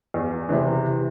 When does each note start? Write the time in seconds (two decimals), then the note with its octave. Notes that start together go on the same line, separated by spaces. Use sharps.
0.14 E2
0.49 C3 E3